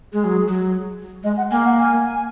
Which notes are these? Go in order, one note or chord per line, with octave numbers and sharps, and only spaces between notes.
G#3 G#4
F#3
F#3
G#3 D#5
F#5
A#3 G#5
F#5
G#5